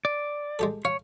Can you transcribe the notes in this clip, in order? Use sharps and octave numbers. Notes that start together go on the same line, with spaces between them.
D5
G#3 G4 A4
C#5 F5